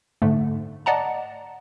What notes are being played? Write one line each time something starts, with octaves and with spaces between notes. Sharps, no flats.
G#2 D3 A3
D5 D#5 F#5 A5 A#5